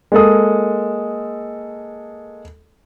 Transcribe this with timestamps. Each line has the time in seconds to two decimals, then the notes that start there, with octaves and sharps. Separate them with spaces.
0.12 G#3 A#3 A4 D#6